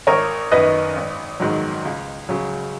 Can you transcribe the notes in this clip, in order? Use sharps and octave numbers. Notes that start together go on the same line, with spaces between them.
G#1 A#4 C#5
F#2 D#3 B4 D#5
G#1
G#2 D#3 F#3
C#2
C#3 F#3